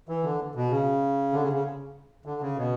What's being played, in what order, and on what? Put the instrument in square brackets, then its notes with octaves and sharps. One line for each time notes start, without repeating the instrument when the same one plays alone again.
[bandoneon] E3
D3
B2
C#3
D3
C#3
C#3
D3
C#3
B2